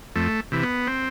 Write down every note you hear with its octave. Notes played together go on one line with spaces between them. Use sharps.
F2 A3
C3 E3
B3
C4